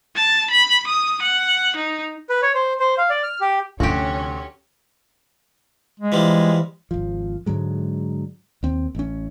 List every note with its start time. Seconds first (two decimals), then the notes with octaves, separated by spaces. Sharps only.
0.16 A5
0.50 B5
0.87 D#6
1.22 F#5
1.76 D#4
2.29 B4
2.42 C#5
2.54 C5
2.80 C5
2.98 F5
3.10 D5
3.23 F6
3.41 G4
3.80 D2 C3 F3 C#4 F#4 G4
6.00 G#3
6.12 E3 F3 G3
6.91 G#1 F3
7.46 G#2 D3 F#3 G#3
8.63 D#2 C4
8.95 A1 C#4